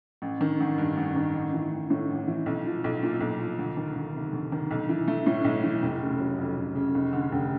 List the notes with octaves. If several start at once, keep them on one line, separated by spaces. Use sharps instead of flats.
A1
D#3
A1
G2
A1
D#3
A1
E3
A1
A2
A1
E3
B1
F3
B1
A#2
B1
F3
D2
D#3
D2
C3
D2
D#3
B1
E3
A3
A2
B1
E3
F1
C#3
F#3
F2
F1
C#3
F1
D3
F1